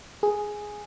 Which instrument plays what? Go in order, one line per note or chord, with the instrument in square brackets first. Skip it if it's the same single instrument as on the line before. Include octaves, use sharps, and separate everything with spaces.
[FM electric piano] G#4